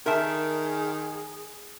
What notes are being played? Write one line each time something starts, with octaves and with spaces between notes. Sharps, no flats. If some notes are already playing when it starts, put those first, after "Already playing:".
D#3 G#4 A#4 E5 A5